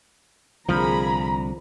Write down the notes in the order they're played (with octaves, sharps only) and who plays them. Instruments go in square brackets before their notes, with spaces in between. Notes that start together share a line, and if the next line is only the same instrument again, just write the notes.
[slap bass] C2 D3 [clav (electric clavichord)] F3 [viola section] A#3 G#4 B5 [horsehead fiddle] A#5